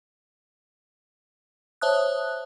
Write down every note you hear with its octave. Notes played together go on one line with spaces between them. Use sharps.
C5 C#5 E5 A5 D#6 F#6